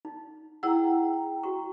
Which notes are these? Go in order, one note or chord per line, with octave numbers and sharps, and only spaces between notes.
D#4
E4 G#4 F#5 G5 A#5 E6
F#4 C#6